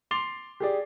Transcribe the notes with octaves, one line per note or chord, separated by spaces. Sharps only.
C6 D6 A6 C7 F7 G7
G4 G#4 D5